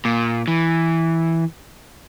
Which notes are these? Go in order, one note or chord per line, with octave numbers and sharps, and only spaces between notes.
A#2
E3